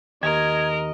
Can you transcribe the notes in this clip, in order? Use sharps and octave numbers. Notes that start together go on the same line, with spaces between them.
D#2 A#4 D#5 G#6